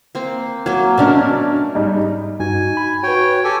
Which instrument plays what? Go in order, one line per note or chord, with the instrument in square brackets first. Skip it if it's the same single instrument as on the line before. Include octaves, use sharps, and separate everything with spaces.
[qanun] A#3 C4
[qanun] F#3 A#3 [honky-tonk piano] G#6
[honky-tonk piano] B2 D4 F6 [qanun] A3 C#4 A#4
[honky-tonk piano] G#2 G3 D#4
[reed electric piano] G2 D#4 F#4 [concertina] G#5
[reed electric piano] B5
[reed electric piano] F#4 B4 [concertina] C#5 G5
[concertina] G4 A4 G#5